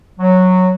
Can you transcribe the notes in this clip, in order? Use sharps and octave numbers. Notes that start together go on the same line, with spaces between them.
F#3